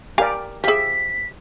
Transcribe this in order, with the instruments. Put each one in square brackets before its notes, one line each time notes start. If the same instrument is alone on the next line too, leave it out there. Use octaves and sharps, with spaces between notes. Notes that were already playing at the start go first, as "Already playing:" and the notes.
[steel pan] G4 A#4 D5 [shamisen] F5 G#5
[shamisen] F3 G#4 [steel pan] G4 E5 [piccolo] B6